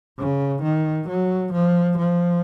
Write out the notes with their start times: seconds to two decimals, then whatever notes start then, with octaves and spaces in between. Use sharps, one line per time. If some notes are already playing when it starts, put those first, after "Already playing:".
0.18 C#3
0.63 D#3
1.09 F#3
1.53 F3
1.98 F3